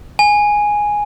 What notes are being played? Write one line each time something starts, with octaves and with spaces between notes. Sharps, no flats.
G#5